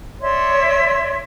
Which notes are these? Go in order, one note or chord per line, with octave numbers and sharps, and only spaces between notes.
C#5 D5 E5 C6